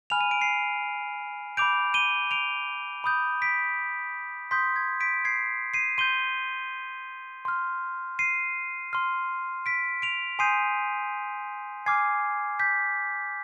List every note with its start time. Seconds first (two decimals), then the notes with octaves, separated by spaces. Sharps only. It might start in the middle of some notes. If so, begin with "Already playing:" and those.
0.10 G#5 B5 F6 F7
0.21 D#7
0.31 D7
0.41 C7 D#7
1.57 B5 D6 G6 D7 F7
1.94 D#7 G7
2.31 D7 F7
3.04 B5 D#6 G6
3.42 B6 D7
4.51 C6 D#6 G6 B6
4.76 G#6
5.00 B6 D7
5.25 G#6 C7
5.74 C7 D#7
5.98 C6 G6 D#7 G7
7.45 C6 F6
8.19 C7 D#7
8.93 C6 F6
9.66 B6 D7
10.02 D7 F7
10.39 G#5 C6 D#6 G6 C7 D#7
11.86 G#5 D6 F6 G#6 C7
12.60 G6 B6